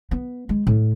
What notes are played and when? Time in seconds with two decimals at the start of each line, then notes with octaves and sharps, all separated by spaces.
0.11 B3
0.49 G#3
0.67 A2